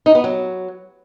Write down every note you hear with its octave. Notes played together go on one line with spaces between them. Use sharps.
D#4
B3
F#3